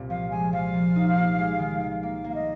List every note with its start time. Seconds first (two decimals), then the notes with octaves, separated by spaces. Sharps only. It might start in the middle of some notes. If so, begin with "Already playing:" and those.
Already playing: C2 A#2 C4
0.10 F3 F5
0.31 G#3 G#5
0.53 F3 F5
0.74 A#3
0.96 D#4
1.17 A#3
1.38 G#3
1.59 D#3
1.81 D#3
2.03 A#3 F5
2.24 A#3
2.30 F5
2.35 D#5